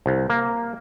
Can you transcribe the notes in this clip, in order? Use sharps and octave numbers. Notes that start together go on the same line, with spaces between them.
C2
A#3